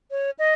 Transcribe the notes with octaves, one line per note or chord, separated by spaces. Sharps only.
C#5
D#5